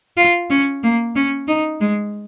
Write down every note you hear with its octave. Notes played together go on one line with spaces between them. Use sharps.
F4
C#4
A#3
C#4
D#4
G#3